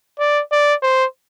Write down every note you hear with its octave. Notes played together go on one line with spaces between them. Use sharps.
D5
D5
C5